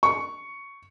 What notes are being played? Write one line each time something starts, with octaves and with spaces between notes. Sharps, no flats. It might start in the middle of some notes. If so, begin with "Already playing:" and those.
C#6